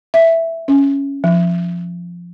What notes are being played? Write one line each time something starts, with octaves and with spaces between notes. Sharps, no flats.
E5
C#4
F3